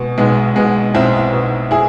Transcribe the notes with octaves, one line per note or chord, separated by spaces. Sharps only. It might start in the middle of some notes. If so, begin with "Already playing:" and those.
Already playing: B2 G#3
B1 G#3 B3
B2 G#3 B3
B1 C4 E4
B2
E4 G#4